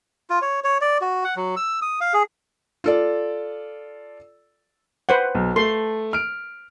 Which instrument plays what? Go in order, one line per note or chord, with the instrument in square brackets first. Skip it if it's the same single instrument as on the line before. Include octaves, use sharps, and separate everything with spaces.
[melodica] F4
C#5
C#5
D5
F#4
F#5
F#3
E6
D#6
F5
G#4
[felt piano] F4 A4 D5
[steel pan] B4 C5 F#5
[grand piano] B1
[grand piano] A3 [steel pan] C6
[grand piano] F6 D7